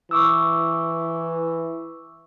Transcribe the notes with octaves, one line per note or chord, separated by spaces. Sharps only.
E3 C#6 D6 E6